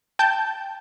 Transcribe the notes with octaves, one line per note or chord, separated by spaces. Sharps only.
G5 A5 G6